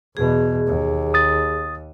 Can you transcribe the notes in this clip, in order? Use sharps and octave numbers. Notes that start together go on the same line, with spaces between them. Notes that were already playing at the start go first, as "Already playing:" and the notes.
E2 B2 G#4
D#2
D#6 A6